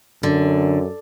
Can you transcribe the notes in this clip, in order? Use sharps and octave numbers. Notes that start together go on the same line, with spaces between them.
F#2 D3